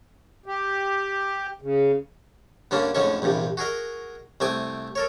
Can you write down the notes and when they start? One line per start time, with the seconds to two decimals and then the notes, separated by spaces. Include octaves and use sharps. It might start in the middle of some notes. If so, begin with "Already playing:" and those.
0.46 G4
1.62 C#3
2.71 G2 D3 A#3 C#4 D4
2.95 F2 A2 D3 G#3 C#4 C#6
3.22 A#1 E2 G2 C3
3.57 F#4 G#4 A#4 D#5
4.40 C2 A3 C4 G#5 D6 D#6
4.95 A4 A#4 C#5